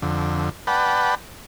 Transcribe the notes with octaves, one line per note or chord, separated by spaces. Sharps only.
F2 D3
B4 D5 F#5 G5 A5 B5